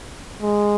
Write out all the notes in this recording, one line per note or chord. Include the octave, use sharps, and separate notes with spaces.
G#3